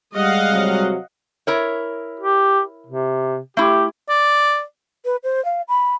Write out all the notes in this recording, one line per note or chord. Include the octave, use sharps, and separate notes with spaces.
G3 G#3 D#5 F5 F#5
C3 F#3
E4 A#4 C#5
G4
C3
A3 E4 G4
D5
B4
C5
F5
B5